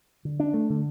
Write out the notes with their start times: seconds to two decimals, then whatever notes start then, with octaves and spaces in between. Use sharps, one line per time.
0.25 D3
0.40 D4
0.54 A3
0.70 D3